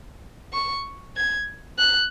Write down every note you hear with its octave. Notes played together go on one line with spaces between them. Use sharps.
C#6
G#6
F#6